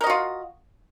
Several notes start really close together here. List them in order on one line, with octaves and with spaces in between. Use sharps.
A#4 D#5 F#4 F4